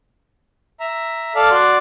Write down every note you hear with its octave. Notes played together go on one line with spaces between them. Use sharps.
E5 A#5
A4 D5 F5 A5
F#4 D5 C6